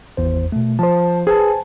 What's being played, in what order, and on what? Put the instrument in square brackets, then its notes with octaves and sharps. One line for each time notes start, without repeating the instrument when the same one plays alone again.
[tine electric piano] G#1 E2 C5
B2 A3
[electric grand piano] F3 C5 [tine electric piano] A5
[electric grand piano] G#4 B4 [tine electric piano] C5 G#5 A5